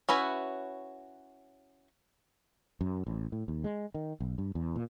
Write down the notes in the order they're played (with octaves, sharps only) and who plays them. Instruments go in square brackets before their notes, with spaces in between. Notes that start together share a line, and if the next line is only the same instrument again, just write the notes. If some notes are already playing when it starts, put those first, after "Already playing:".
[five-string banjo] C#4 E4 F#4 B4
[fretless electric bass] F#2
A1
A2
D#2
G#3
D#3
B1
G2
E2
A#2